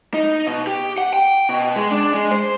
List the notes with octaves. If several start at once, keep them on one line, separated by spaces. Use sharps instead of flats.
D#4
B2
G4
F#5
G5
B2
G#3
D4
G#3
C5